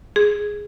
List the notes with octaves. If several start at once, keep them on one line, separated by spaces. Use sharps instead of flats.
G#4